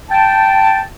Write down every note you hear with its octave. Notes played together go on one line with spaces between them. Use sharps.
G5 A5